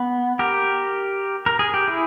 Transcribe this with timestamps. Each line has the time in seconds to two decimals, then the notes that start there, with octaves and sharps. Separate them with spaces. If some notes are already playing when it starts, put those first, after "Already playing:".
Already playing: B3
0.39 G4 A#4
1.46 A#4
1.59 G#4
1.74 G4
1.88 E4 G#4